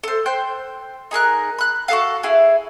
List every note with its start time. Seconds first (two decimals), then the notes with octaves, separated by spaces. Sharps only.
0.04 A4 C5
0.26 C5 G5 F#6 G6
1.11 D#4 G#4 A#4 F#6
1.59 B5 F#6
1.88 F#4 G#4 A4 F5
2.23 E4 G#4